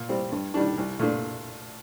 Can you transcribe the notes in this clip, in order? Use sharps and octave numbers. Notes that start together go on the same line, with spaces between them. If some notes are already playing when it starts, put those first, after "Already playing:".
Already playing: A#2
G3 C4
G2
D#3 G3 D4
C2
A#2 A3 D4